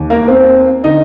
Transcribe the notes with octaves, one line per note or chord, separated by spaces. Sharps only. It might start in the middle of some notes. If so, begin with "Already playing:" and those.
Already playing: D#2 D#3
A#3 A#4
C4 C5
D3 D#4 D#5